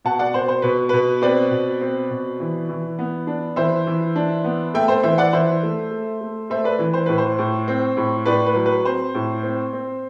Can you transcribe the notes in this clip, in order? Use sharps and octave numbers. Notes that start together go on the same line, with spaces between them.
B2 F#5 A5
D5 F#5
B2 C5
C5
B2 B4
B2 B4
C4 B4 D5
B2
C4
B2
E3
E3
B3
D4
E3 C5 E5
E3
D4
B3
A3 E5 G5
C5
E3 C5 E5
D5 F#5
E3 C5 E5
A3
A3
A3
A3 C5 E5
B4 D5
E3
C5
A2 B4
C5
A2
C4
A2
A2 B4 D5
B4
F#3
B4
C4 C5
A2
C4
C4